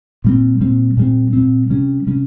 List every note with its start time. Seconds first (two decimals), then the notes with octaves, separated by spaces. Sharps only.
0.24 A#2 G3 C4
0.61 A#2 G3 C4
0.97 A#2 G3 C4
1.33 A#2 G3 C4
1.69 C3 G3 C#4
2.07 C3 G3 C#4